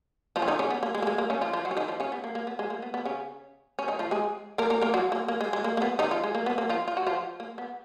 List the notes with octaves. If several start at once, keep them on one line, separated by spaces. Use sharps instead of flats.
F3 F4
C#4
D#3 D#4
C#3 C#4
B3
A#3
G#3
A#3
G#3
A#3
C#3 C#4
F3 F4
F3 F4
F#3 F#4
C#4
D#3 D#4
F3 F4
C#3 C#4
B3
A#3
A#3
B3
G#3
A#3
B3
B3
C#3 C#4
C#4
D#3 D#4
F3 F4
G#3 G#4
A#3 A#4
A#3 A#4
A#3 A#4
F#3 F#4
A#3
A#3
G#3
G#3
A#3
A#3
B3
D#3 D#4
F3 F4
G#3
A#3
B3
A#3
F3 F4
F4
F#4
F3 F4
A#3
B3